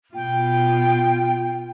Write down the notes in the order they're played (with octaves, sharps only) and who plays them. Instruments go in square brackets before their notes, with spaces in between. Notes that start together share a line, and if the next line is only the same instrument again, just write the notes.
[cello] B2 F4 [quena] G5